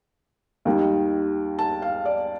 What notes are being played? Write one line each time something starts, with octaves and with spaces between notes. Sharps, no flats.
D#2 D#3 G3
A5
F5
D5